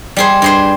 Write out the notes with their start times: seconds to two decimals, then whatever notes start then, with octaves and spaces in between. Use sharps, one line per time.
0.17 G3 G#4 C5
0.42 G2 G#4 C5